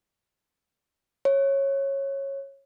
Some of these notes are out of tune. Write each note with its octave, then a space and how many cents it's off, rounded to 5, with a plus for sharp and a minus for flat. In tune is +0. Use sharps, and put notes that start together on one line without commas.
C#5 -15